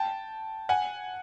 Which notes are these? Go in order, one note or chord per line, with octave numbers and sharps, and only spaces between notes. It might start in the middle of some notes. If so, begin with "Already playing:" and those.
Already playing: G5 A5
F#5 G#5